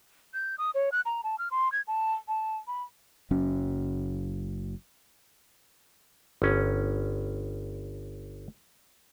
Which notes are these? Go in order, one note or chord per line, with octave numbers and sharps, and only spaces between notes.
G6
D#6
C#5
F#6
A#5
A5
F6
C6
G#6
A5
A5
B5
F#1 F#3 C#4
G1 C#4